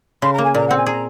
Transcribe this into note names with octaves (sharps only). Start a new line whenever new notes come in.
C#3 C6
A#5
A#3
G#5
A#2 A#5
C4 F#5
G#5
G#4 A#5